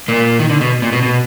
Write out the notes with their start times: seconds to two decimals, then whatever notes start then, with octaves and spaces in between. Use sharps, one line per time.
0.08 A#2 A#3
0.39 D#3
0.50 D3
0.61 B2
0.82 A#2
0.92 B2
1.03 B2